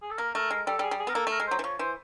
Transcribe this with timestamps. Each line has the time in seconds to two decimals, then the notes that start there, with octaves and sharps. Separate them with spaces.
0.02 G#4
0.11 A4
0.18 A#3 A#4
0.35 A3 A#4
0.51 G#3 A#4
0.67 G3 A4
0.79 G3
0.82 G#4
0.91 G3
0.99 G#4
1.07 B3 A#4
1.15 A#3 A4
1.27 A3
1.32 A#4
1.40 G#3
1.47 F#3 C5
1.59 E3
1.64 F3 C#5
1.79 E3 C5